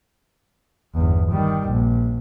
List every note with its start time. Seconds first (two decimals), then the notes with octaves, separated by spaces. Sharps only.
0.95 G1 E2
1.32 D#3 G3
1.69 A#1